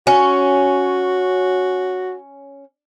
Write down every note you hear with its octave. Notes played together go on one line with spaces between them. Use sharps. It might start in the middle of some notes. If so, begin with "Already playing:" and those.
C#4 F#4